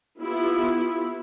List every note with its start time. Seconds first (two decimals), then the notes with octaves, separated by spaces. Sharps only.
0.19 B3 E4 F4 G4